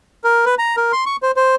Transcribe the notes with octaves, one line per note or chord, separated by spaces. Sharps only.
A#4
B4
A#5
A#4
C6
C#6
C5
C5